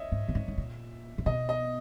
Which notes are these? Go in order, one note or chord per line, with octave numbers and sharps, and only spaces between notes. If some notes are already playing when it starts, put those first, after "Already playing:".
Already playing: C#5 D#5 E5
G#2
A#2
G#2
G#2
A#2
A#2
B2 D#5
D#5